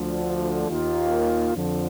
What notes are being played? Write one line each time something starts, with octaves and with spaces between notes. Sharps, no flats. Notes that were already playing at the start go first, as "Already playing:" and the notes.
Already playing: D2 D3 F3
D#2 D#3 A#3 F4
F2 D3 F3